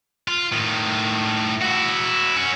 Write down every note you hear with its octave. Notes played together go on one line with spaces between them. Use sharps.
F4
A2 D#3
E4 F#4
C#4 F#4